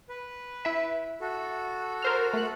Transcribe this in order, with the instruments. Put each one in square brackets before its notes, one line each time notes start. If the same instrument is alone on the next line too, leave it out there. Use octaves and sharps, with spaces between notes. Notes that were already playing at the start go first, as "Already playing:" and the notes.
[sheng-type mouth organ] B4
[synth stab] E4 E5
[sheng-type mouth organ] F#4 A4
[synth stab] A#4 C5 F6
A3 F#6